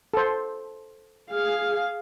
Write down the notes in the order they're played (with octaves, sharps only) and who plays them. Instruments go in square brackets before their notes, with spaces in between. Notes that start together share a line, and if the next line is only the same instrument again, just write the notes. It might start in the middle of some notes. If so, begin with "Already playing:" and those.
[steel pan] A4 C5
[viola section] G#4 F5